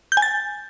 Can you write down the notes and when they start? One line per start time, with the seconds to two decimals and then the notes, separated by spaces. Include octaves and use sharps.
0.12 G6
0.17 G#5
0.22 A6